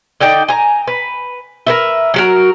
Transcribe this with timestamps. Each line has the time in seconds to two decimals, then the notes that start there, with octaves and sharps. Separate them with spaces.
0.20 D3 D#4 D5 G5
0.48 G#5 A#5
0.87 B4
1.67 A#4 B4 E5
2.14 F#3 F#4 A#4